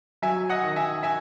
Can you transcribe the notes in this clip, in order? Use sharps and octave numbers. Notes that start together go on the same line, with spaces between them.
F#3 E5 G#5
D#5 F#5
D#3
E5 G#5
E5 G#5